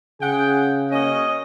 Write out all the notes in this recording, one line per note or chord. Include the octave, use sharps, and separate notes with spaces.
C#3 G#4 F#5 G5
A#3 C#4 F#4 D#5